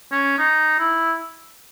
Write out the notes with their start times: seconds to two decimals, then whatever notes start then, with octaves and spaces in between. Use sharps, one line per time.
0.12 C#4
0.39 D#4
0.79 E4